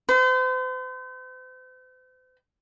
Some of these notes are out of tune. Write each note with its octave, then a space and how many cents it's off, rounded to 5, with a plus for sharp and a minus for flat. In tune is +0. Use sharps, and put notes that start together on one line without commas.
C5 -40